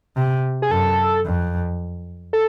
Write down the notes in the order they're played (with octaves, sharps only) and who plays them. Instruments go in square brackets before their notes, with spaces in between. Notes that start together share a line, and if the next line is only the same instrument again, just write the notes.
[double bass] C3
[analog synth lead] G#4
[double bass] F#2 [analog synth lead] A4
[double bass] F2
[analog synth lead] A4